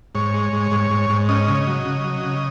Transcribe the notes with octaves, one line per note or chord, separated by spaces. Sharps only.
G#2 C#5
G#3
G#2
G#2
G#2
G#2
C#4 D#5
C#3
F#3
C#3
F#3
C#3